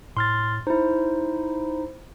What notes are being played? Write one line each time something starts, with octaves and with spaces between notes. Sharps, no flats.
A2 C6 F6 A6
D#4 E4 C5